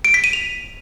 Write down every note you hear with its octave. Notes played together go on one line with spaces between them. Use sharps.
D7
B6
D#7
F7